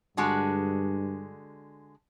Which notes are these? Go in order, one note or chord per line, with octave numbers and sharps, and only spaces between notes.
G2 D3 G#3 F#4